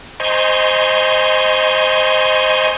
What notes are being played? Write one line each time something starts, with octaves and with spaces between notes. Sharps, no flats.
C5 D#5 G#5 A#5 C6 C#6